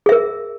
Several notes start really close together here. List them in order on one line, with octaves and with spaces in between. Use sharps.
G#4 E5 A#4